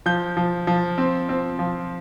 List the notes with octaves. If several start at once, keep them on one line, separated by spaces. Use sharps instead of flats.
F3 G6
F3
F3
C4
C4
F3